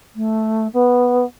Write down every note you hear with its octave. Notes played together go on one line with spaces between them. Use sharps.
A3
B3